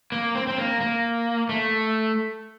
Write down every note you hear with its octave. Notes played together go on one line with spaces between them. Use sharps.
A#3
C4
C4
A#3
A#3
A3